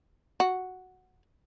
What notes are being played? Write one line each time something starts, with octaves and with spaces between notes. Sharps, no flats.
F#4